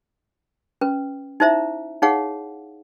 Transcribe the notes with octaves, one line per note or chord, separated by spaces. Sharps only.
C#4 B4
D#4 E4 C5 E5 A#5
D#4 G#4 C#5 F5 F#5